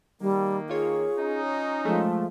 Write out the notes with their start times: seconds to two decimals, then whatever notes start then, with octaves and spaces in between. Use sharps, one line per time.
0.21 D#3 G3 A#3
0.69 F4 G#4 C#5
1.18 C#4 D#4
1.85 F3 G#3 A3